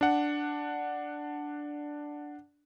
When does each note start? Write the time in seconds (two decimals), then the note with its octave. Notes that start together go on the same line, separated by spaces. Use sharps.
0.01 D4 F#5